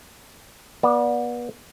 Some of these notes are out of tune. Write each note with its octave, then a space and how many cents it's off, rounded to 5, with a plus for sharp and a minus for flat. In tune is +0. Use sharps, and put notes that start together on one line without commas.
B3 -35 D5 +0